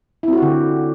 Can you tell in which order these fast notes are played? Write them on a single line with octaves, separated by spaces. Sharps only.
E4 C4 F#4 G4 D3